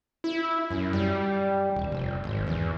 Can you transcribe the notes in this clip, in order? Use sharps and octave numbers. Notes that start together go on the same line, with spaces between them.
E4
F#2
G3
D#1
F1
G#1
E2